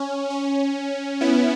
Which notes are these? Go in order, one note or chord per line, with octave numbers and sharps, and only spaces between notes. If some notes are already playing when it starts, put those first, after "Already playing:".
Already playing: C#4
C#4
B3 E4